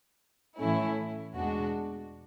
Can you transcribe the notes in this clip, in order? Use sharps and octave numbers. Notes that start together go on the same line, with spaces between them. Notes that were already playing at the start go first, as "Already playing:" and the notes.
A2 E3 A3 C#4 E4
E2 B2 G#3 D4 F#4